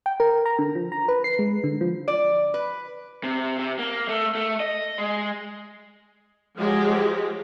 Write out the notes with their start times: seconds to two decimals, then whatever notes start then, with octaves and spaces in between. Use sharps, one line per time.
0.06 G5
0.20 A#4
0.46 A#5
0.59 D3
0.75 F3
0.92 A#5
1.08 B4
1.24 C7
1.39 G#3
1.64 D3
1.81 F3
2.08 D5
2.54 B4
3.23 C3
3.59 C3
3.79 A#3
4.09 A3
4.35 A3
4.60 D#5
4.98 G#3
6.56 F3 F#3 G#3 G4